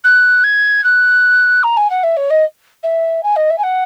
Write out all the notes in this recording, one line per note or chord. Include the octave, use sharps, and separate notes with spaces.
F#6
G#6
F#6
A#5
G#5
F#5
E5
C#5
D#5
E5
G#5
D#5
E5
G#5
F#5